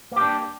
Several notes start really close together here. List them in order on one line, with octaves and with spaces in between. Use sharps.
A#3 G4 D4